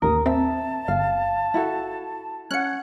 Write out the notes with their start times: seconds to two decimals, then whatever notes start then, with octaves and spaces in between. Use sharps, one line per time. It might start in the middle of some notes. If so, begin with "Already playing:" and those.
0.02 A1 D#2 A#4 D#6
0.26 C4 E5 A5
0.88 G1 F5
1.54 E4 F#4 A4
2.51 C#4 F#5 F#6 G#6 C#7